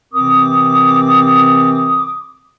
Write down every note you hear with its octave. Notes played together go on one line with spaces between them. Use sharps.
C3 E3 C4 A#4 D6 D#6